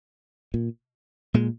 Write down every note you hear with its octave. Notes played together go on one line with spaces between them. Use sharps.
A#2
A#2 G#3